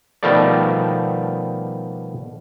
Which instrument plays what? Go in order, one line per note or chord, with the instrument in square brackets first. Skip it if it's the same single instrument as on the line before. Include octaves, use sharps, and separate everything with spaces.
[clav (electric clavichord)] B2 D#3 F3 G3 A3 D5